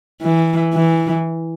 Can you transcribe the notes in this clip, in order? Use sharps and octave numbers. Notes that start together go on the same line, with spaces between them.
E3
E3